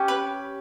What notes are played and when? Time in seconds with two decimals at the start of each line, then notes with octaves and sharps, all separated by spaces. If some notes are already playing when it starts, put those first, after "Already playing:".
Already playing: C#4 G4
0.08 B4